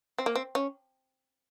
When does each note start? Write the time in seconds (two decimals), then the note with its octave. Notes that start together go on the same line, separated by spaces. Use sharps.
0.18 C4
0.26 A#3
0.36 C4
0.55 C#4